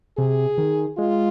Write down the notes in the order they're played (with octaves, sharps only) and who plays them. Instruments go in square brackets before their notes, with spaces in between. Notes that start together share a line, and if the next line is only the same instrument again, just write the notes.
[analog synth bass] C3 [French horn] G#4
[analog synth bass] D#3
[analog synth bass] G#3 [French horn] F4